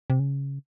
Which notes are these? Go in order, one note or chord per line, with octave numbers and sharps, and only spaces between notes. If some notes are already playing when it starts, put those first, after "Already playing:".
C3
C#3